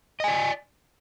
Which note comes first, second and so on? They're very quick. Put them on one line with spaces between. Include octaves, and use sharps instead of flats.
D#5 G#5 D5